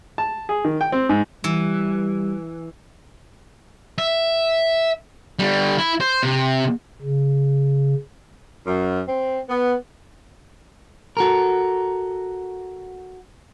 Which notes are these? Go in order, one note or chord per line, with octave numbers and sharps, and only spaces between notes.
A5
G#4
D#3
G5
C4
G#2
E3 G3
E5
D3 G3
E4
C5
C3
C#3
F#2
C4
B3
F#4 A4 A#4